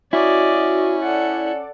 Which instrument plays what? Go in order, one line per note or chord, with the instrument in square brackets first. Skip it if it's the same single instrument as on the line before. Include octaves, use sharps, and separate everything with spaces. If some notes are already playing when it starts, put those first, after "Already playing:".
[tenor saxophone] C#4 [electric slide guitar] E4 [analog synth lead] F#4 [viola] D5 D#5
[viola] A4 F#5 [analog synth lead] D5